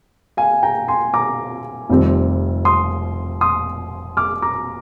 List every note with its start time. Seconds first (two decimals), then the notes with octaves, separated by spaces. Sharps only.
0.37 F5 G#5
0.63 G5 A#5
0.88 G#5 C6
1.14 A#5 D6
1.89 F1 F2 D#3 G3 C4
2.65 C6 D#6
3.41 C6 D#6
4.17 D6 F6
4.42 A#5 D6